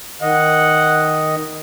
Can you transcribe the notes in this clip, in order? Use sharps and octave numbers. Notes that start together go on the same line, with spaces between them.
D#3 D#5 F#5